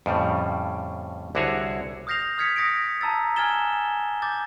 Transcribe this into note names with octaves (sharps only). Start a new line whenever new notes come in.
F2 A2 C#3 G3
C2 D3 E4 F#4 G#4 C#5
D#6 F6 G6 A#6 C7 F7
D#6 F6 G#6 B6 C#7
D#6 A#6 C#7 D7
A5 A#5 E6 A6
G#5 F6 G#6 A6 E7 G7
D6 G6 A6